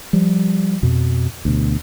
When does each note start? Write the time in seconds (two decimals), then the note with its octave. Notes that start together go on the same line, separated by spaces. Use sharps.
0.13 F3 G3
0.83 F2 B2
1.45 D2 B2